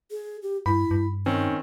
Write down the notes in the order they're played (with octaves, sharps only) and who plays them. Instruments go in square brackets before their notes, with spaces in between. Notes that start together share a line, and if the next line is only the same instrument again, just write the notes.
[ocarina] G#4
G4
[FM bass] G2 [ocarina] E4 [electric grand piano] B5
[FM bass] G2
[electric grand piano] D#3 C4 C#4 [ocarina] D#4